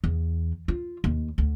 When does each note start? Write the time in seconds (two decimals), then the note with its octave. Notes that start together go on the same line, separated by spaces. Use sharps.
0.04 E2
0.68 F4
1.04 D#2
1.38 D2